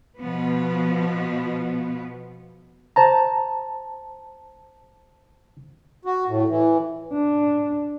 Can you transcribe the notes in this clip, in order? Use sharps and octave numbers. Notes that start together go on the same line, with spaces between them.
B2 F3 B3
C5 A5 A#5
F#4
A2
E3
D4